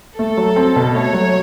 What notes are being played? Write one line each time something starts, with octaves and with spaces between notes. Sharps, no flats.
A3 A4
F#3
C4
B2
A3 C#5
F#3